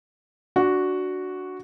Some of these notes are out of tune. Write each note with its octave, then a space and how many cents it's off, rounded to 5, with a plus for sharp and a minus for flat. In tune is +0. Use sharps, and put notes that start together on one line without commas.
D4 +0 F#4 +0